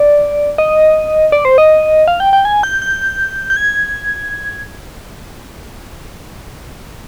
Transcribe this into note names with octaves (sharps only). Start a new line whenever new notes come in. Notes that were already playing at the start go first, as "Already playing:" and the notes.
Already playing: D5
D#5
D5
C5
D#5
F5
G5
G5
G#5
G6
G6
G6
G#6